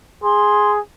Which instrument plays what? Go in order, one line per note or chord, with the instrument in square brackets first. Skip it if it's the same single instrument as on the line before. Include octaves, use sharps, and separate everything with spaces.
[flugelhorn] G#4 [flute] C6